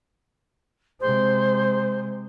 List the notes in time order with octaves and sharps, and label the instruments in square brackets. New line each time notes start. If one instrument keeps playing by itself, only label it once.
[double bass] C3 G#3 [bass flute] C5